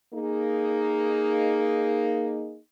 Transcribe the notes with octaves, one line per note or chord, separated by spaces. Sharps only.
A#3 D#4 G#4